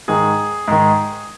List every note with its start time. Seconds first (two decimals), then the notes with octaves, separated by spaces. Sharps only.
0.08 G#2 D#3 G#4
0.68 G#2 D#3